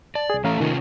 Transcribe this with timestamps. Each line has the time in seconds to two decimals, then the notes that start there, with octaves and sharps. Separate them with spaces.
0.15 D5 A5
0.30 C2 G#4
0.44 E3 A3 C#4 A4 F5 A#5
0.60 C3 D#3 A3 C#4 F4